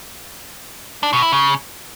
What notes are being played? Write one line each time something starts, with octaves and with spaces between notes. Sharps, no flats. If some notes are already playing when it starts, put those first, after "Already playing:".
D4
B2
E4
C#3